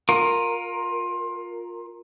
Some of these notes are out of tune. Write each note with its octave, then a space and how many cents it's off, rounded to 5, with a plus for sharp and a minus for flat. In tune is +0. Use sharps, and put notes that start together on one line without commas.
F4 +20 A#4 +0